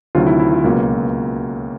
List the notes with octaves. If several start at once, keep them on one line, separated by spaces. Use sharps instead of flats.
D2 C3 D#3 F#3 F4
E4
E4
F4
C#2 B2 F#3 A#3